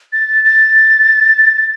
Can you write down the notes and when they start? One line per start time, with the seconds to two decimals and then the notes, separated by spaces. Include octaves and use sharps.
0.13 A6
0.44 A6